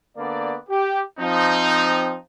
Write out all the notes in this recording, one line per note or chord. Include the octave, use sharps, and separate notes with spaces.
D3 A#3 B3 D5
G4
F3 C4 D#4